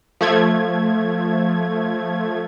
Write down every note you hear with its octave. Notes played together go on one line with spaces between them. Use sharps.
F3 A3 G#6